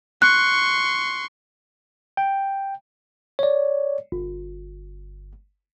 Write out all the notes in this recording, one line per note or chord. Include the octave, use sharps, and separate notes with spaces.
C6 C#6 F#6
G5
C#5 D5
G1